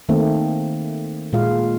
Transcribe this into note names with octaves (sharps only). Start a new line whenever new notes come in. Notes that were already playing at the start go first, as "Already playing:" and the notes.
D#3 A3 A#3 C4
A#2 G#3 F4 F5